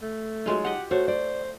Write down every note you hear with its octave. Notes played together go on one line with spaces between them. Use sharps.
A3
F#3 G#3 D#4 F4
G4 D#5 F#5
A3 F#4 C5 C#5
C5 D5